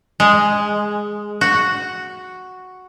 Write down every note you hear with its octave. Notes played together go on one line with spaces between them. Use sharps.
G#3
F#4